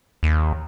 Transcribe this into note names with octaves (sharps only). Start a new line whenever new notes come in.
D#2